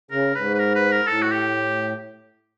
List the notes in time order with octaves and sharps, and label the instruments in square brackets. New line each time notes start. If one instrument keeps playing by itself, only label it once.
[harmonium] C#3 [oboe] A#4
[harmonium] G#2 [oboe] B4
[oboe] B4
A#4
B4
A#4
[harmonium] A2 [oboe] A4
[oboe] F#4
G4